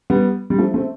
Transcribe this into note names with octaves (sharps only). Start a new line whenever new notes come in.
G3 B3
G3
F3 A3
A3 C4